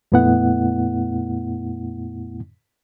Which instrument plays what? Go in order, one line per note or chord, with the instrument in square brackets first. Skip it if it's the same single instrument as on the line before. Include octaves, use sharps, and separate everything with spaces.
[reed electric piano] F2 A#2 A3 B3 E4 F#5